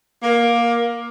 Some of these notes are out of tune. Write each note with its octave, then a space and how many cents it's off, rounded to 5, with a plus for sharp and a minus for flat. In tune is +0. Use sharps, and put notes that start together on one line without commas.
A#3 +15